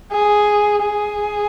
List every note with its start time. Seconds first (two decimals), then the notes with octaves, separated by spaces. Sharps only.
0.12 G#4
0.82 G#4